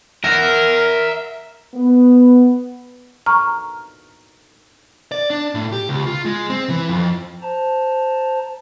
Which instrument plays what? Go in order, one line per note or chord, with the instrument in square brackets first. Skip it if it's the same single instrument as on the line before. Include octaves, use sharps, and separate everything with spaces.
[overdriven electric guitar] A#4 [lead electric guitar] E5 F#5
[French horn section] B3
[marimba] A#5 C#6 F6
[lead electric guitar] D5
D4
A2
G4
C#2
F4
G#3
C4
E3
F2
[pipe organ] C5 A5 A#5